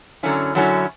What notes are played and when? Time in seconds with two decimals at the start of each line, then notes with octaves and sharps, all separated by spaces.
0.23 F#2 D3 F#3 C#4 E4
0.55 F#2 D3 F#3 C#4 E4